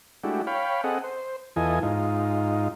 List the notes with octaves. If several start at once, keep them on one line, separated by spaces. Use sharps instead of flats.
G#3 A3 D4 E4 F#4 G4
C#5 F5 G5 B5
C4 G#4 A4 D#5 F#5
C5
E2 E3 F4 A4 D#5 G#5
G#2 D#4 F4